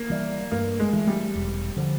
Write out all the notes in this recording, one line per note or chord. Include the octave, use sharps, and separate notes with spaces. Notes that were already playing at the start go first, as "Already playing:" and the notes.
Already playing: A#3
E3 G3
G2 A#3
G#3
E3 A3
G3
E1
D3 F3